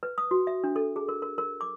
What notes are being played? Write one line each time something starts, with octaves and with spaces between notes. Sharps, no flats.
B4
D#6
F#4
E5
D4
A4
G#4
A#4
A#4
A#4
D6